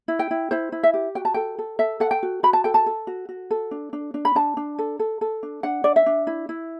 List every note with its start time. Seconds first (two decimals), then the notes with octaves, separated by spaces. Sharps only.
0.08 E4
0.19 G5
0.31 E4
0.51 E4 C5
0.72 E4
0.83 E5
0.94 G4
1.15 F#4 G5
1.25 A5
1.34 A4 G5
1.58 A4
1.79 A4 E5
2.00 A4 F#5
2.11 G5
2.23 F#4
2.43 F#4 B5
2.53 A5
2.64 A4 G5
2.74 A5
2.86 A4
3.07 F#4
3.29 F#4
3.51 A4
3.71 D4
3.93 D4
4.14 D4
4.25 B5
4.35 D4 A5
4.57 D4
4.79 A4
4.99 A4
5.21 A4
5.43 D4
5.63 D4 F#5
5.84 D4 D5
5.96 E5
6.06 D4
6.27 E4
6.49 E4